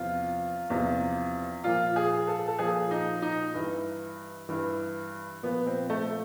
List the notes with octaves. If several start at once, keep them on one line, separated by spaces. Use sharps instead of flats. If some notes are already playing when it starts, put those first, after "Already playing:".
Already playing: E2 C3 F3 F4
E2 C3 F3
A#2 F3 F4
G#4
A4
A4
A#2 F3 G#4
D#4
D#4
G2 E3
G2 E3
A#2 F3 B3
C4
A3